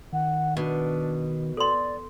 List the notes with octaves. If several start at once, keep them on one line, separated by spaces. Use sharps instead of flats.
D#3 F#5
B2 D4
A4 D5 C6